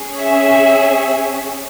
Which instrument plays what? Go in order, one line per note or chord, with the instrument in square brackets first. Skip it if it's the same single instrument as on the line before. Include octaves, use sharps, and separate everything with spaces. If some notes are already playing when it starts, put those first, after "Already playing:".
Already playing: [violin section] C#4 G#4
E5